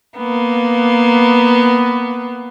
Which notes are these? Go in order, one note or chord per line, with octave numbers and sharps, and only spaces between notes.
A#3 B3